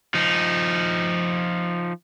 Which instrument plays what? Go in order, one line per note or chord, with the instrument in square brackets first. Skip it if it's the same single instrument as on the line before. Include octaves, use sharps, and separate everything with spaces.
[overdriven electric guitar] F3 D#4